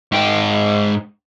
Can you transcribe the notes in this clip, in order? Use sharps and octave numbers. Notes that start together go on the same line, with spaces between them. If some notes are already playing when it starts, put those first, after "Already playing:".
G#2 G5